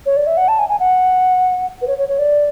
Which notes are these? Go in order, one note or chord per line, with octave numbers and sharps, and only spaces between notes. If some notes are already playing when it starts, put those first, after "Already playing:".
C#5
D5
E5
F#5
A5
G#5
G#5
F#5
B4
C#5
C#5
C#5
D5